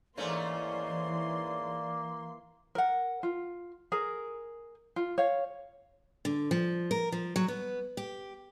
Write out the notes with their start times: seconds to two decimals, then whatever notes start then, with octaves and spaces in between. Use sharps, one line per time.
0.17 G#2 E3 A3 A#3 C#4 D5 C6
2.75 A#4 F#5
3.23 F4
3.92 G#4 A#4
4.96 F4
5.18 C#5 F5
6.25 D3
6.51 F3
6.91 A#4
7.12 F3
7.36 F#3
7.48 B3
7.97 G4